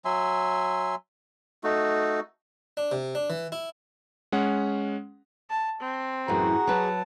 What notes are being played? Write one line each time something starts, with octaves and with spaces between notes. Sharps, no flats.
F#3 E5 G#5 C6
A3 D#4 F#4
D4
C3
D4
E3
E4
G#3 C#4 F#5
A5
C4
F#2 A2 E3 F#4 G#4 F#5 A#5
F#3 B4 A5